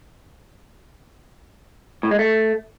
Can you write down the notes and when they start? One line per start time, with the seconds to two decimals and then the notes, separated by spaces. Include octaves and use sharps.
2.03 A2
2.11 G#3
2.19 A3